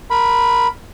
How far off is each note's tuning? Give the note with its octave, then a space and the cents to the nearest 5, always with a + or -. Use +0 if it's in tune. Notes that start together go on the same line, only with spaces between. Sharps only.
A#4 +0 B5 +0